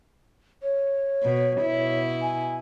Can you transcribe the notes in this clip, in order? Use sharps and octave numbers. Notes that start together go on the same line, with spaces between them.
C#5
B2
B2 E4
G#5